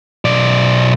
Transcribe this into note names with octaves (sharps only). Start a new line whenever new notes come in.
B1 D5